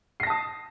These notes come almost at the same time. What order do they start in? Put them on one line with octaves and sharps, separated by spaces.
C7 A#6 A5 D#6